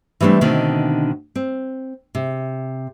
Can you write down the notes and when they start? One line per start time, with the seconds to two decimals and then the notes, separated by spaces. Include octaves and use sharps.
0.21 E3 G3 A3 C4 D4
0.41 B2 D3 D#3 A3 C4
1.36 C4
2.15 C3